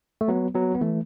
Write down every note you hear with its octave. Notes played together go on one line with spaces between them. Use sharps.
A3
F#3 B3
F#3 B3
B3
E3 A3